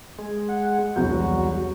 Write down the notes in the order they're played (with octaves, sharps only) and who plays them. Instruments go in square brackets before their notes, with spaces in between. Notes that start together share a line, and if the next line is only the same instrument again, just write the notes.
[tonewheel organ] G#3
[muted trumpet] F#5
[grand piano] E1 C2 G6 [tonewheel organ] F#3 [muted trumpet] F#4